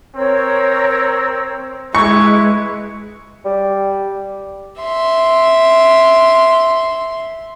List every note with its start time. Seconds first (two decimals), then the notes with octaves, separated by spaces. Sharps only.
0.15 C4 A#4 C#5 E6
1.95 G#3 E4 B4 C#6 G#6
3.45 G3
4.81 E5 C6